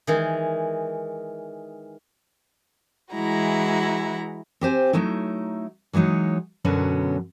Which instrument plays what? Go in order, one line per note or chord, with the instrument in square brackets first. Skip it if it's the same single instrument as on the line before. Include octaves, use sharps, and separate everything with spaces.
[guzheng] D#3 E3 G#3
[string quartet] E3 G#3 E4 F#4 A#5
[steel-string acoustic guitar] C4 G4 C5 G#5
F#3 A3 D#4 E4
E3 F#3 G#3 D#4 C#5
F#2 B2 D3 F#3 B3 C#4